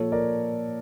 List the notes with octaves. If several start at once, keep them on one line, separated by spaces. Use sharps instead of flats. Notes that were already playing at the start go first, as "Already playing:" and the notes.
Already playing: A#2 F3 A4 C#5
A#4 D5